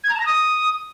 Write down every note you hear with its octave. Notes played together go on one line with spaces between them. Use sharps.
G#6
A#5
A5
A#6
D#6